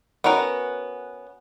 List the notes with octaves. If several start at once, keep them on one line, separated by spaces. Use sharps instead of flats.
B3 C#4 F#4 A#4 A#5